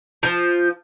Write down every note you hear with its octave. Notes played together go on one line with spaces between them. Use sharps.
F3